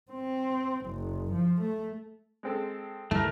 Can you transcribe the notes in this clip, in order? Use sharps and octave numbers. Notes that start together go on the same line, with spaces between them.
C4
F#1
F3
A3
G#3 C4 A4
C#2 G2 E3 G3 A3 A#4 A5